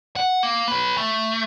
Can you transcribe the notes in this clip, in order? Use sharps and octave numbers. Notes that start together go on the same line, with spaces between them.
F#5
A#3
B4 C#5
A3